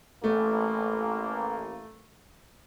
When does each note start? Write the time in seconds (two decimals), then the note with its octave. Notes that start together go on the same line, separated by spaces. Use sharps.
0.24 A1 A3 A#3